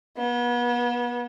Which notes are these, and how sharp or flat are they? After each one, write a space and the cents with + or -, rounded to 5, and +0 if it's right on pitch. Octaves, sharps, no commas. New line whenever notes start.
B3 -35